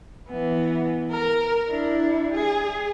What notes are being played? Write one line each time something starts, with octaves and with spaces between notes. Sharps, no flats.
E3 B3
A#4
D4 E4
G#4